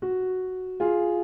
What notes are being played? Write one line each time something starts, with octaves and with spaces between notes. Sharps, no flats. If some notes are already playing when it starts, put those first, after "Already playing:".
F#4
F4 G#4